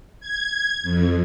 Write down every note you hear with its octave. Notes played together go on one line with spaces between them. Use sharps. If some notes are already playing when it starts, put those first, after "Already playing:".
G#6
F2